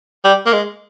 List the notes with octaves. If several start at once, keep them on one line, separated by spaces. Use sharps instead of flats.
G3
A#3
G#3